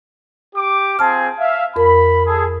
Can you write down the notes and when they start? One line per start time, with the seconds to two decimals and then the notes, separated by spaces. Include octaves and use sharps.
0.55 G4 D6
0.99 C4 F4 G#4 A5 F6
1.39 E5 F5
1.76 F2 A#4 B5
2.27 G#4 A4